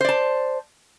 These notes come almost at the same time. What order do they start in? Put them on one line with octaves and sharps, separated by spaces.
C5 D5 A5